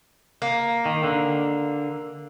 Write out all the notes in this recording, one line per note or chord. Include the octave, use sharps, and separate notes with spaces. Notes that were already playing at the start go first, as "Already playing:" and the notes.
A#3
D#3
D3